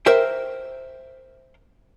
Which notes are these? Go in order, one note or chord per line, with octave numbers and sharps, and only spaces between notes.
A#4 C5 E5 G5